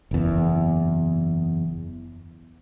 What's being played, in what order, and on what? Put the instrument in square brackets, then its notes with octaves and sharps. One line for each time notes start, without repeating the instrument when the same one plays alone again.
[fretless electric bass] F#1 E2